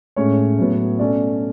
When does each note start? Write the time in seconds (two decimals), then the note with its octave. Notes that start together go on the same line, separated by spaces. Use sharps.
0.16 A2 G#3 C#4 C#5
0.58 A2 F#3 B3
0.99 B2 A3 C#4 D5